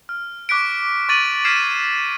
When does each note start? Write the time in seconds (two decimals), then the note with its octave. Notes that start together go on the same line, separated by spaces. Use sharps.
0.09 F6
0.49 C#6 D6 F#6 B6 D7
1.09 C#6 D6 A6 D#7 F#7
1.45 F6 G#6 B6 C7 D7 E7